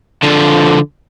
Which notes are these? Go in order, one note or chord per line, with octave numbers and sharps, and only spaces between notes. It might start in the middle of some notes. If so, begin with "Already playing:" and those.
D3 F3